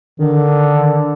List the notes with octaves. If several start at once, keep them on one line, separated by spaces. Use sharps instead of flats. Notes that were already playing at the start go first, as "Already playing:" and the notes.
D3 D#3